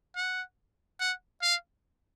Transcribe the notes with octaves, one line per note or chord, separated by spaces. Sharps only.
F#5
F#5
F5